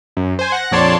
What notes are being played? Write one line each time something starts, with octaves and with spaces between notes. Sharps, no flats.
F#2
C5 G#5
F#5 A#6
A#1 F2 C#5 D5 A5 C6